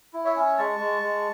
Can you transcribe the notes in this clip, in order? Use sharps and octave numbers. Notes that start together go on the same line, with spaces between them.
E4
C#5 E5
C#4
G#3 A5 C#6
G#3
G#3